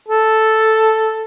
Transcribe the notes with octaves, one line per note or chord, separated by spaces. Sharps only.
A4